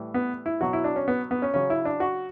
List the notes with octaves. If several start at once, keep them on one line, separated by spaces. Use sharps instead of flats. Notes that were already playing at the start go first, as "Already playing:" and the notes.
Already playing: A2 E3 G3
B3
E4
B2 F#3 F#4
E4
D4
C#4
B3
B3
C#4
C#3 F#3 C#4
E4
D4
F#4